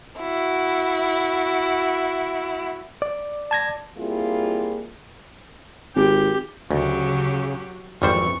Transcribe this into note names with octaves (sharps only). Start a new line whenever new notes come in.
E4 F#4
D5
A5 G#6 A#6
G3 A#3 C4 E4 F4 G#4
G#1 G4
D2 C#3 F#3 G4
G#1 F2 E3 G3 C5 C#6